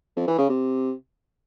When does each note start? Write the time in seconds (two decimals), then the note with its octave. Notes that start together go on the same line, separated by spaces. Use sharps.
0.17 F2
0.28 E3
0.39 C#3
0.49 C3